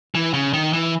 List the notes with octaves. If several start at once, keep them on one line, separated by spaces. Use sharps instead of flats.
E3
C#3
D#3
E3